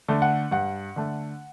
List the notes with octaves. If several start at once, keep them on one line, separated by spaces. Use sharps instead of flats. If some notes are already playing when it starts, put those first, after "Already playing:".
D3 A3
F#5
G2 F#5
D3 A3